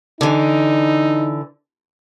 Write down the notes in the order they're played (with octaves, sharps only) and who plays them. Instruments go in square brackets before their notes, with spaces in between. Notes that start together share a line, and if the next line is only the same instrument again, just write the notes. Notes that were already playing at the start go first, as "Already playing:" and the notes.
[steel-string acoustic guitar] D3 E3 [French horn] D#4